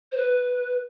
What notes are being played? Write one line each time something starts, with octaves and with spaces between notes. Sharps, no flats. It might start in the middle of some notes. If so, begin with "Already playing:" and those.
C5
B4